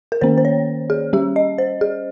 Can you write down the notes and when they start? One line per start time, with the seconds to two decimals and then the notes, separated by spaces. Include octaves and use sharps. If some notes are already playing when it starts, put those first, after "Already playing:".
0.12 A#4
0.21 D#3 A#3 C#4 C5
0.38 C5
0.45 C#5
0.90 G#4
1.13 G3 C#4 G4
1.36 D#5
1.58 C5
1.81 G#4